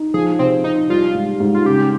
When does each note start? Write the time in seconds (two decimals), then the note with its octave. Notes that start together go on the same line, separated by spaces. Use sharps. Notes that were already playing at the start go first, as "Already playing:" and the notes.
Already playing: D#4
0.14 F3 G#4
0.39 C3 C4
0.64 C3 D#4
0.89 G3 F4
1.15 G#2
1.40 G#2
1.54 F4
1.65 C#3 G4